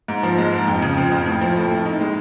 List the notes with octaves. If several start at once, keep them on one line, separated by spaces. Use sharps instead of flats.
G#2
F3
G#3
G#2
F2
C#3
F3
F2
A2
F3
A3
A2
D#4
G#3